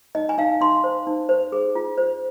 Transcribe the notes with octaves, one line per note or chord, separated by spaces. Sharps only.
D#4 D#5
G#5
D#4 F5
D#4 C6
C5
D#4
C5
G#4
F4
C5